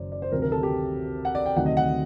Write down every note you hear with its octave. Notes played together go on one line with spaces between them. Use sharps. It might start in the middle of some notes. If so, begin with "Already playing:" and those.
Already playing: F#1 F#2 D#3 C5 D5
D5
C5
D2 C3 D#3 F#3 A#4
A#4
A4
G4
F#5
D5
G5
D2 C3 D#3 F#3 A3 F#5
D#5
F#5